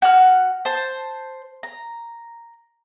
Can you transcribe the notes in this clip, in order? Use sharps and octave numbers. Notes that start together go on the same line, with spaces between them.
F#4 F#5 F6
C5 A5
A#5